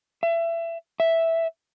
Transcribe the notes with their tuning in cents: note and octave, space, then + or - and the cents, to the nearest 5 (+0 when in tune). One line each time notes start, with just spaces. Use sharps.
E5 +25
E5 +0